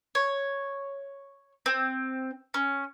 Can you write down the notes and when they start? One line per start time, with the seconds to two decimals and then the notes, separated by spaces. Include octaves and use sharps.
0.15 C#5
1.66 C4
2.54 C#4